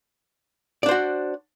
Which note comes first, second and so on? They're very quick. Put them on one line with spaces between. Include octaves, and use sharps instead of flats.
D5 D4 C5 F#4